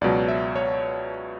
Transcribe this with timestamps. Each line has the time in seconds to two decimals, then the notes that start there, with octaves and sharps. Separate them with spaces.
0.01 C#2 B2 F#3 D5
0.28 E5
0.56 C#5